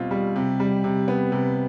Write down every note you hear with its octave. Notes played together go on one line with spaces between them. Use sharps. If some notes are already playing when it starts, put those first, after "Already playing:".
Already playing: B2 G3 C4 F4
G3
C3
G3
C3
B3
C3